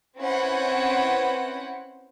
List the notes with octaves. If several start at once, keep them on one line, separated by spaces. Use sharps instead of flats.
C4 C#4 E4 B4 C5 F#5